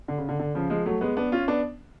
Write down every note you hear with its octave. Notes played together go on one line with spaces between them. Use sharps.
D3
C#3
D3
D3
C#3 F3
F3 G#3
F#3 A3
G#3 B3
B3 D4
C#4 F4
B3 D4